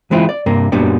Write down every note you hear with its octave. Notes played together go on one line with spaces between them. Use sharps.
E3 G#3 C4 E4 F4
D5
G2 C3 A#3
F#2 A#2 F#3 G3 B3 D4